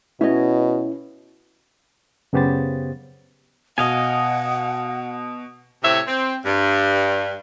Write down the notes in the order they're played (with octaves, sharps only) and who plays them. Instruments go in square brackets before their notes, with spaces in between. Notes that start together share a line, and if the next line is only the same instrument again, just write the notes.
[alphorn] B2 [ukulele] C#4 C#5 D#5 [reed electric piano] E4
[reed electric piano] F#2 C#3 B3 G4 C5 A6
[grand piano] B2 [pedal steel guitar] D#5 F5 G#5 [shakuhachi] F#5
[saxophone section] A2 C3 C4 C#5 E5
C4
G2